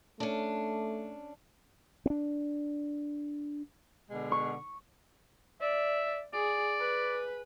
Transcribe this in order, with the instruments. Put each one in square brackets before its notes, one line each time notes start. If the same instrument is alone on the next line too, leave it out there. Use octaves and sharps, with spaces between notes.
[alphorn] A3 [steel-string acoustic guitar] C#4 D4
[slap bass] C4 D4
[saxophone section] B2 D3 G#3
[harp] C#6
[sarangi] D5 [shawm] E5
[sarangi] G#4 [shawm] D5
[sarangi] B4